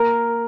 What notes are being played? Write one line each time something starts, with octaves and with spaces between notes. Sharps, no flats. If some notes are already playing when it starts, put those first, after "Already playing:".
Already playing: A#3 A#4